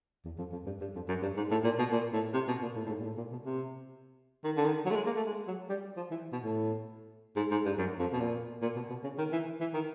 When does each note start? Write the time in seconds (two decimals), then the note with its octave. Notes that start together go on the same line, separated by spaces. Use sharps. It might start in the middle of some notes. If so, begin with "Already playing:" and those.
0.25 E2
0.38 F2
0.52 F2
0.66 G2
0.81 G2
0.95 F2
1.08 F#2
1.22 G2
1.37 G#2
1.51 A2
1.64 A#2
1.79 B2
1.92 A#2
2.13 A2
2.34 C3
2.48 B2
2.62 A#2
2.76 A2
2.86 A2
2.89 G#2
2.99 A#2
3.04 A2
3.17 A#2
3.32 B2
3.45 C3
4.44 D#3
4.57 D3
4.65 D#3
4.86 F#3
4.91 A3
4.96 G#3
5.06 A#3
5.16 A3
5.27 G#3
5.48 F#3
5.69 G3
5.97 F3
6.11 E3
6.33 B2
6.43 A2
7.36 G#2
7.51 G#2
7.65 G2
7.78 F#2
7.99 F2
8.13 B2
8.21 A#2
8.62 A#2
8.76 B2
8.90 B2
9.04 C#3
9.18 D#3
9.32 E3
9.61 E3
9.74 D#3